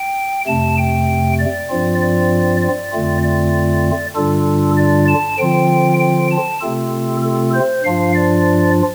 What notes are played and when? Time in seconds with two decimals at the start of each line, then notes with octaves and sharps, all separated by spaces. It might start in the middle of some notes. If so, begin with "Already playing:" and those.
Already playing: G5
0.47 F2 C3 A3 A5
0.78 G5
1.39 D5
1.70 G2 F3 C4 F4
2.01 D5
2.62 D5
2.93 F2 D3 A3 C4 F4
3.23 D5
4.16 G2 D3 G3 D4 F4 A4
4.77 D5
5.08 A5
5.39 D3 F3 C4 F4 G5
6.00 G5
6.30 A5
6.61 C3 A3 C4 F4 A4
7.23 A4
7.54 C5
7.84 G2 F3 D4 F4 F5
8.15 D5